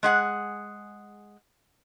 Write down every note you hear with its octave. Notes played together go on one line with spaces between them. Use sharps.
G#3 G#4 F#5